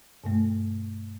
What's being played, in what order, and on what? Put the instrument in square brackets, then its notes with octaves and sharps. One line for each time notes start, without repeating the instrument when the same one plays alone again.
[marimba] G2 B2 A3